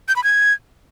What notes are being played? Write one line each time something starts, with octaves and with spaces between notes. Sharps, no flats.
G6
B5
G#6